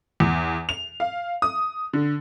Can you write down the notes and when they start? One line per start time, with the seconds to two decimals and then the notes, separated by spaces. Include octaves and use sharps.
0.20 E2
0.69 F7
1.00 F5
1.42 D#6
1.93 D3